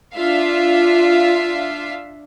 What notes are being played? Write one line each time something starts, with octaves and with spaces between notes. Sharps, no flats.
D4 F4 E5 F5